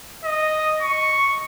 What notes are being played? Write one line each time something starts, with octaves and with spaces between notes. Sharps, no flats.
D#5
C#6